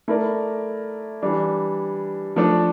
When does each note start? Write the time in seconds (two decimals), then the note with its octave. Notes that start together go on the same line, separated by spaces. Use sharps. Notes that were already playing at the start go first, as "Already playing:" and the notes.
0.08 A3 E4 A#4 D5
1.22 E3 G3 D4
2.36 F3 A3 D4 A4 D5